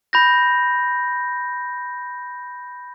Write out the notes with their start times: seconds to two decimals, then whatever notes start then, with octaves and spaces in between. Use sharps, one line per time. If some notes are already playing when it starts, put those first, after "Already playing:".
0.13 B5 G6 A#6